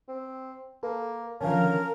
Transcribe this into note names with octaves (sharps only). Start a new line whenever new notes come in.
C4
A#3 A4 B4
D3 D#3 F3 C#4 A#4 F5 G#5 A5